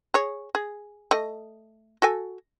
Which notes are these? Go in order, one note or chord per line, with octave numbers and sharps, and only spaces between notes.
G#4 C#5
G#4
A3 D#5
F#4 A4 G#5